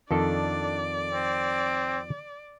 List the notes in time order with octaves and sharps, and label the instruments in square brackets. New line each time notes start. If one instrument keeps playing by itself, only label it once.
[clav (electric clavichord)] F2 D#3 A4 [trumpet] D4 [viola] D5
[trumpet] C4